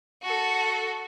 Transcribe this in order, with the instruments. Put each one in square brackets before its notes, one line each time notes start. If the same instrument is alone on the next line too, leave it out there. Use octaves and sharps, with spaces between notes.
[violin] F#4 A4